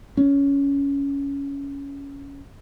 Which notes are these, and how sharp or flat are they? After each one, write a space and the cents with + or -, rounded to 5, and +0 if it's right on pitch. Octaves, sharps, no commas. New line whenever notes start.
C#4 +15